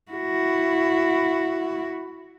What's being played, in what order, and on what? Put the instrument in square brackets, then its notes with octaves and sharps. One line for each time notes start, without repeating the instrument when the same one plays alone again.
[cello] E4 F#4